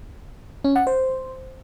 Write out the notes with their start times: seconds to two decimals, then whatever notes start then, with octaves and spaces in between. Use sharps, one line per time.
0.64 C#4
0.76 F#5
0.87 C5